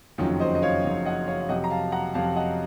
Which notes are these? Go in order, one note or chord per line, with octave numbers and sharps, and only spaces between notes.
F#1 F2 D#3 F#3 C#4 F4
C5 D#5
D#5
C#5 F5
F#1 F2 D#3 F#3
D#5 F#5
C#5 F5
F5
F2 C3 F#3 D#5 F#5
A#5
F5 A5
F#5 A#5
F2 C3 F#3 F5 A5
D#5 F#5